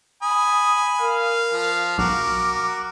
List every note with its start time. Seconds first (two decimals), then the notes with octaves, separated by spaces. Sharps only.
0.22 G#5 B5 D#6
1.00 A#4 F5
1.53 F3
1.98 B1 F#4 A#4 D6